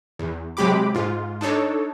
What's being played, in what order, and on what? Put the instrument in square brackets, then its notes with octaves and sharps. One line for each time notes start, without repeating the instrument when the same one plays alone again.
[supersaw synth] E2
C3 F#3 G#3 G4 B5 D6
G#2 F4
D4 D#4 A4 C#5